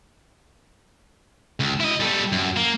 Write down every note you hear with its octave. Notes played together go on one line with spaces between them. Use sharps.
C#2
E4 D#5
G3 A4
F#2
A#3